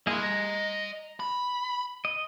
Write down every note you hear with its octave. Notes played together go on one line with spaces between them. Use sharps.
A#3 E4 G#4 D#5 C6
A#5
B5
D#5